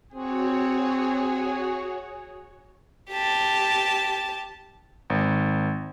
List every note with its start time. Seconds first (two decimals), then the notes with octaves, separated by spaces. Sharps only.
0.14 C4 F#4 G#4 C#5
3.11 G4 A5
5.10 G#1